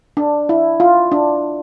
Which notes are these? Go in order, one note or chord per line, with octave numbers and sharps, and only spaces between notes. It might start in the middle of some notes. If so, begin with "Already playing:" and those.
D4
E4
F4
D4